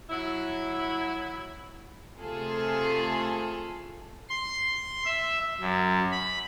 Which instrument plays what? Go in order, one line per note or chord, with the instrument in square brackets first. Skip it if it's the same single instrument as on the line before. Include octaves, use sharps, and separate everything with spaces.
[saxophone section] F#3 E4
[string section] C3 A3 F4 G#4 A4
[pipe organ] C6
E5
F#2
B5